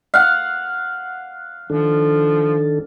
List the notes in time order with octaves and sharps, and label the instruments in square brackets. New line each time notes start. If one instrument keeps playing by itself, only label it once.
[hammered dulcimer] F5 F#5
[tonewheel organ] D#3 D4 A4 [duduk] F3